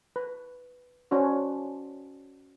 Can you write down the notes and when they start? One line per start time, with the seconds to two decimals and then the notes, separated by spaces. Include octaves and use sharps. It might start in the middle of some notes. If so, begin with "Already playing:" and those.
0.16 B4
1.11 C#4 D4 F#4 C5